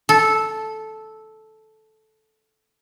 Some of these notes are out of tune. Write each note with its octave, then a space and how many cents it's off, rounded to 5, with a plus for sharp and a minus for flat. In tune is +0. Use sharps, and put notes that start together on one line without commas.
A4 -10